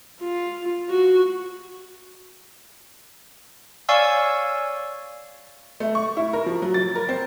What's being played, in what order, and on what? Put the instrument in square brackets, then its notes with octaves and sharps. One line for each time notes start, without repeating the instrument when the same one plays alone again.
[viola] F4
F#4
[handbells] C#5 D5 F5 G#5 C#6 E6
[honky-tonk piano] A3
C#6
E4
A#4
F3
F#3
A6
A#4
C4